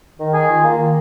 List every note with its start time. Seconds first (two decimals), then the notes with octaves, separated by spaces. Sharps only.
0.18 D#3
0.34 G#4
0.49 F4
0.63 A#3
0.78 D#3